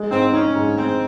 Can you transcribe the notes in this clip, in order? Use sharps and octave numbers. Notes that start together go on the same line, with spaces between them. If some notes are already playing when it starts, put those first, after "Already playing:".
Already playing: G#3
G#2 C4
C#4 D#4
G#2
G#3 C4